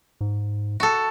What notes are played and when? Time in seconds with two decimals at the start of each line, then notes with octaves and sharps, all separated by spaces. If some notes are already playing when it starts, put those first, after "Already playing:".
0.21 G#2
0.80 F#4 A4